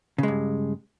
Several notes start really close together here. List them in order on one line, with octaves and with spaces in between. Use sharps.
C#3 G#3 G2